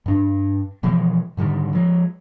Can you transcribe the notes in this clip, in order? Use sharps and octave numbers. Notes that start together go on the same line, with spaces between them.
G2 D4
B2 E3 F3 G#3
G#2 D3 D#3 G3
F3 G#3